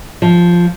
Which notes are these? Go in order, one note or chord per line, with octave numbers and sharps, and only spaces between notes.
F3